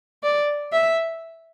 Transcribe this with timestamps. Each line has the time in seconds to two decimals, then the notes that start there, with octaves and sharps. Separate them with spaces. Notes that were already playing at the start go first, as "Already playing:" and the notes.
0.23 D5
0.73 E5